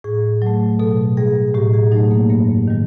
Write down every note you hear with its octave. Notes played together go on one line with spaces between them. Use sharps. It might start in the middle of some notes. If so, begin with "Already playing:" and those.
A2 G#4
F#3 A3
B2 A4
G3 G#4
A2 G4
G#4
F#3 A3 D#4
A#3
G2 A#3
D#3 G3